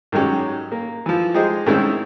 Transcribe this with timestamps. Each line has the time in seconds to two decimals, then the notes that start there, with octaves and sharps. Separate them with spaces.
0.12 G#2 D#3 F#3 C#4 G4
0.72 A#3
1.06 E3 F3
1.34 G#3 D#4 G4 G#4 C5
1.66 G#2 D#3 A3 C4 C#4 E4